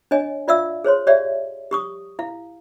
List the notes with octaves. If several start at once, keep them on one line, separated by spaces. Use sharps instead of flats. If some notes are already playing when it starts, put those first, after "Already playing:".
D4 C#5 D#5 G#5
F4 D5 E5 F5 E6
G#4 C5 C#5 C6
G4 C#5 D5 E5 F5
G4 C#6 D#6
E4 F5